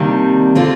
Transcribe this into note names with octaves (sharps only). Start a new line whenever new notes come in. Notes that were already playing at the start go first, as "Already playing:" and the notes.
Already playing: C3 D#3 G3 A#3 D4
D3 A3 C4 F4